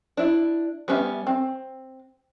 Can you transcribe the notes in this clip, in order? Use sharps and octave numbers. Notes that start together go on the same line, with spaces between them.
D4 E4
G3 B3 C#4 E5
C4